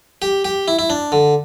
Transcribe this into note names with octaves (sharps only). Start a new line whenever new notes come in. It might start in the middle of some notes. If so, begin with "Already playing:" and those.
G4
G4
E4
E4
D4
D3